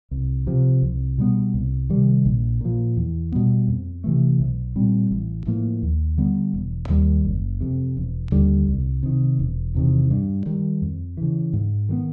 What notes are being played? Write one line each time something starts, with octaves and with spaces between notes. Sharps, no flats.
C2
C3 F3
C2
B2 G3 B3
C2
C3 D#3 G3
A#1
A#2 F3
E2
B2 G3 B3
F2
C3 E3 A3
B1
A#2 G3 C4
A1
A2 F3 A#3
D#2
D3 G3 B3
E1
D#2 D#3 G3
F#1
F2 C3
E1
D#2 D3 G3
C2
C3 D#3
E1
E2 C3 D#3
G2
D#3 G3
F2
C#3 E3
G#2
D#3 G3 B3